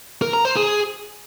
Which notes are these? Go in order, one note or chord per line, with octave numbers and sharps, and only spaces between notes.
A#4
A#5
C5
G#4